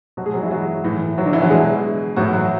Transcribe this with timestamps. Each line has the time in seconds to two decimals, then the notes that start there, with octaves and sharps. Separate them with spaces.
0.17 B2 F#3 F#4
0.26 G#3 G#4
0.34 F#3 F#4
0.42 E3 E4
0.51 F#3 F#4
0.84 A2 E3
1.17 F#3 F#4
1.26 D3 D4
1.33 E3 E4
1.42 F#3 F#4
1.50 B2 G#3 G#4
2.16 A2 E3 F#3 F#4
2.33 F#3 F#4